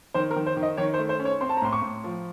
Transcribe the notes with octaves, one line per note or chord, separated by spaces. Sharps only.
D#3 C5
A#4
D#3
C5
D#3
D#5
D#3 C#5
C5
A3
C5
C#4
C#5
C4 C6
A5
A#5
A2 C6
C#6
A2
F3